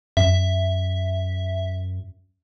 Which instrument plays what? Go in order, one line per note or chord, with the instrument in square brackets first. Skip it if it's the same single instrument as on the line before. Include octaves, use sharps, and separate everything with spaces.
[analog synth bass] F#2 [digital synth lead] E5